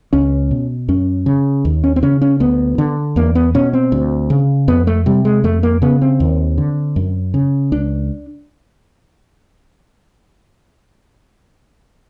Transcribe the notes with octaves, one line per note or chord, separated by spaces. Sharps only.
C#2 C#4
B2
F#2 C#4
C#3
D#2
C#4
C4
C#3 C#4
C#4
D2 B3
D3
E2 A#3
B3
B2 C#4
C4
D2
C#3
F2 B3
A3
C3 G3
G#3
F2 A3
A#3
C#3 B3
C4
D#2
D3
F#2
C#3
C#2 D4